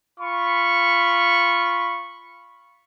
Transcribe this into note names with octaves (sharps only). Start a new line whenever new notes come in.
F4 B5 C#6